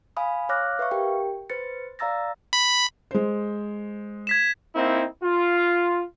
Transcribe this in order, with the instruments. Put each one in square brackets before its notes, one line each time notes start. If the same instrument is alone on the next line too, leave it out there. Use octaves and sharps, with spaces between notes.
[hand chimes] F5 G#5 B5 D#6
C#5 F5 D6 F6 F#6 A#6
B4 E5 F5 C#6
G4 A#4 G5
B4 C5 A6 C#7
D5 F5 A#5 E6 A6 A#6
[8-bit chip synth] B5
[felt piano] G#3 C5
[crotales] G#6 B6 E7
[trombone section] A#3 C4 D#4 E4
F4